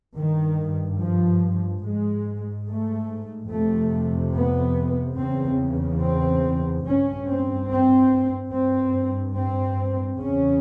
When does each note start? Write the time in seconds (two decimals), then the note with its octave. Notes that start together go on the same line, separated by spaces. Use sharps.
0.15 G2 D#3
1.00 F3
1.84 G#2 G#3
2.68 A3
3.51 F2 C3 A3
4.36 B3
5.19 E2 C#3 C4
6.03 C4
6.86 G2 C#4
7.29 C4
7.71 C4
8.54 G2 C4
9.38 C4
10.21 E2 C#3 C#4